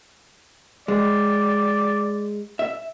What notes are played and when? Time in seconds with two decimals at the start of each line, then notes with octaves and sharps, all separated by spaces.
0.88 G#3 D5
2.59 E5